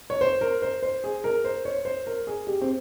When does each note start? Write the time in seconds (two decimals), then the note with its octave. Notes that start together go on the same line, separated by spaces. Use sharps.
0.10 C#5
0.21 C5
0.41 A#4
0.62 C5
0.83 C5
1.04 G#4
1.24 A#4
1.44 C5
1.65 C#5
1.85 C5
2.07 A#4
2.27 G#4
2.47 G4
2.61 C4